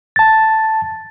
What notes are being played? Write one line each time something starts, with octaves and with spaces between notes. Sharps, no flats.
A5 A6